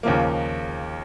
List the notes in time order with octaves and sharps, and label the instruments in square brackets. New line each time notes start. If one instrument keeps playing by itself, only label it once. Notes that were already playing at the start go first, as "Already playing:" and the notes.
[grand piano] D#2 C#3 F3 A#3